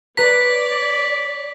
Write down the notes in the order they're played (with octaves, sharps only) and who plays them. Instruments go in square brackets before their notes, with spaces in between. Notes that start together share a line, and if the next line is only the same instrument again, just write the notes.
[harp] B4 A#5 [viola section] C#5 D5 [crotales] B6